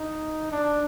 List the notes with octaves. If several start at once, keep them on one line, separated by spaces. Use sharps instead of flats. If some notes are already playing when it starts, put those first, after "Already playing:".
Already playing: D#4
D4